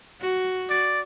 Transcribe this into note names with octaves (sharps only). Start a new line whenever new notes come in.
F#4
D5